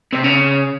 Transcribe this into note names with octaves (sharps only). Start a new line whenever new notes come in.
C3
C#3